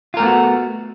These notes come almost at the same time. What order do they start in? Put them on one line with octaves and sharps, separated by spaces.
F4 A#4 A3 B3 F#4